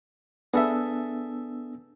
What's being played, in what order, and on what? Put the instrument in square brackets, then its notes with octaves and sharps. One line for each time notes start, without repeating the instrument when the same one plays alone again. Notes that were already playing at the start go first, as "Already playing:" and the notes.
[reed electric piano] B3 D4 [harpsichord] G#4 A4 E5